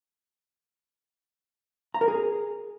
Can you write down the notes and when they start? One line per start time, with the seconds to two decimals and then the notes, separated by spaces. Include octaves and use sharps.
1.94 A#5
2.01 A#4
2.08 G#4